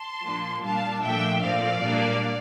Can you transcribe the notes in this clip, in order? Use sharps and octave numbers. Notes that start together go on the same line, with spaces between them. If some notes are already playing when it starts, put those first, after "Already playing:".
Already playing: A5 C6
A#2 F3 A#3 D4
A#2 G3 D4 F5 A5
A#2 F3 A3 D4 E5 G5
A#2 F3 A3 C4 D5 F5
A#2 G3 A#3 D4